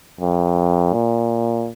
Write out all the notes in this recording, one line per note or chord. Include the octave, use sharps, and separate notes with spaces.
F2
A#2